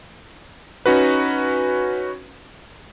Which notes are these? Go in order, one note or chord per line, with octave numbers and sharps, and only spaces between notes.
C#4 D#4 F#4 B4